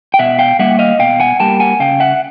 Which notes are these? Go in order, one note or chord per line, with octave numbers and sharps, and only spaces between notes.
G5
B2 E5 F#5
F5 G5
G3 A#3 E5 F#5
D#5 F5
B2 F5 G5
F#5 G#5
G3 A#3 G5 A5
F#5 G#5
C#3 F5 G5
E5 F#5